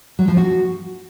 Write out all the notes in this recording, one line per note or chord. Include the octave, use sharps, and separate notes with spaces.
F#3
F3
F#4